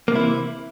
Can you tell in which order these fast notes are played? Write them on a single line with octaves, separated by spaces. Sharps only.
A#3 C3 E4 E3